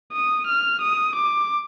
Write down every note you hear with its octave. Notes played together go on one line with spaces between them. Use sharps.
D#6
F6
D#6
D6